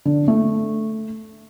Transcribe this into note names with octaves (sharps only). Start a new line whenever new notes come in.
D3
A3